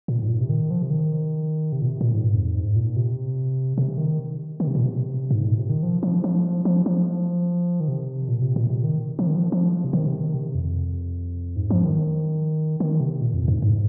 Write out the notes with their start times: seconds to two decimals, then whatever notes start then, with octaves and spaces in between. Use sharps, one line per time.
0.08 A#2
0.22 G#2
0.29 A#2
0.41 C3
0.49 D#3
0.71 F3
0.82 C3
0.90 D#3
1.72 C3
1.82 A#2
1.86 C3
2.01 A#2
2.14 G#2
2.35 F2
2.54 G#2
2.76 A#2
2.96 C3
3.78 C3
3.98 D#3
4.60 D#3
4.67 C3
4.75 A#2
4.83 C3
5.31 G#2
5.45 A#2
5.57 C3
5.69 D#3
5.83 F3
6.03 F3
6.24 F3
6.65 F3
6.86 F3
7.80 D#3
7.88 C3
8.28 A#2
8.42 C3
8.56 A#2
8.70 C3
8.83 D#3
9.19 F3
9.27 D#3
9.35 F3
9.52 F3
9.84 C3
9.93 D#3
10.07 C3
10.20 D#3
10.34 C3
10.55 F2
11.56 G#2
11.70 F3
11.85 D#3
12.80 D#3
13.00 C3
13.21 A#2
13.34 F2
13.48 G#2
13.62 G#2